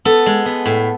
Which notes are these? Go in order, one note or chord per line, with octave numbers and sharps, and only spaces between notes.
B3 A4
G#3
B3
A2